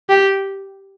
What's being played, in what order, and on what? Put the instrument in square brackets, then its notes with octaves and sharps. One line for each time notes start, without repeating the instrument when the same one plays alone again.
[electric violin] G4